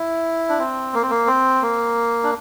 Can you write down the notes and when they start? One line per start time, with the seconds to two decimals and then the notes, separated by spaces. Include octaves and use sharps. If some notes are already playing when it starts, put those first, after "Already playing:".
Already playing: E4
0.49 D4
0.59 C4
0.94 A#3
1.03 C4
1.10 A#3
1.27 C4
1.62 A#3
2.23 D4